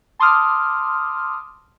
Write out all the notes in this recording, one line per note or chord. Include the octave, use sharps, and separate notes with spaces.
A5 C6 D6 D#6 F6